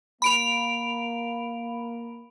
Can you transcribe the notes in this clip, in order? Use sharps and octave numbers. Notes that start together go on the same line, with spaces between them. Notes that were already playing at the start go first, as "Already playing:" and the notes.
A#3 B5 D7 F7